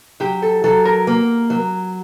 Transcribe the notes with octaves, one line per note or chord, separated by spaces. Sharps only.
F#3 G4
A4
F#3 A4
A#4
A#3
F#3